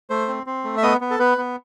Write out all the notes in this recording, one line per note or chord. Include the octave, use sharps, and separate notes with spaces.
A3 C5
C4
C4
A3
E5
B3 D#5
B3
A4
B3 B4
B3